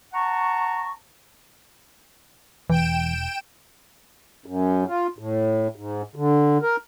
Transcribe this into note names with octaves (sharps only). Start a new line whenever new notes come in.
F#5 A5 A#5 C#6
E1 E3 G5 D7 E7
F#2
F4
A2
G#2
D3
A#4